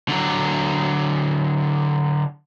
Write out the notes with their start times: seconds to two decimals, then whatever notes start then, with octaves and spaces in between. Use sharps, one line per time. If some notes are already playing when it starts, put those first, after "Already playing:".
0.09 D3 F#3